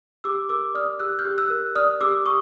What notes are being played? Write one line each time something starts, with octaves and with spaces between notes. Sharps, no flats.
G4 D6 E6
A#4 D6 E6
D5 D#6 F6
G4 E6 F#6
F6 G6
G4
E6 F#6
A#4
D5 D#6 F6
G4 D6 E6
G4 C#6 D#6